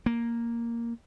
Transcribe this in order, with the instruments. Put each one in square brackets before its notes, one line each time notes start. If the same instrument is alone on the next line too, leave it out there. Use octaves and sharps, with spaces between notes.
[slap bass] A#3